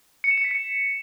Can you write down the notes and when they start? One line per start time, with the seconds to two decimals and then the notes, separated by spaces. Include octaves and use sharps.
0.24 C#7
0.31 E7
0.38 C#7
0.44 B6
0.51 C#7